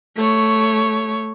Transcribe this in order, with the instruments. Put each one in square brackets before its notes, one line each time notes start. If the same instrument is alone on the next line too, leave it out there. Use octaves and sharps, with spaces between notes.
[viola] A3 C#5